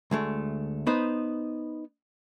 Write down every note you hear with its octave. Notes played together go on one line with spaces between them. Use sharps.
D2 G#3 A3
B3 D#4 B4 C5